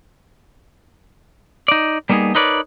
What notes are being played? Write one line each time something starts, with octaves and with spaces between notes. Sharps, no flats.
D#4 D5
G3 A#3 B3 D#4 G#4
D#4 A#4 B4 C#5 D5